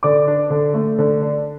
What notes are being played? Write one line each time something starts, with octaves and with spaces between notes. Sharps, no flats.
D3 D5 D6
D4
D3
A3
D3
D4